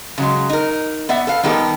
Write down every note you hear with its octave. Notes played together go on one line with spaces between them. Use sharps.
C#3 F#3 G#3
D#4 A#4
B3 D5 E5 F#5
A4 B4 F5
D#3 G3 B3 G4 A4 A#4